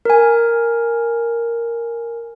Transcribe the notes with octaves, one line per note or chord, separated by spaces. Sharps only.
A#4 G#5